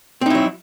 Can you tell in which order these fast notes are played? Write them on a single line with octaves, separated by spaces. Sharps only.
C4 D#4 E4 F#3